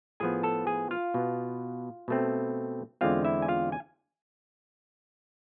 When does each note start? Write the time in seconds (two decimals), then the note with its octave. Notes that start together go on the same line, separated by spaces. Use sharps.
0.20 A2 F3 B3 G#4 G#5
0.43 A4 A5
0.67 G#4 G#5
0.91 F4 F5
1.14 B2 B3
2.08 B2 A3 C4
3.01 E2 D3 G#3 C4 F4 F5
3.25 E4 E5
3.42 G#5
3.48 F4 F5
3.72 G#5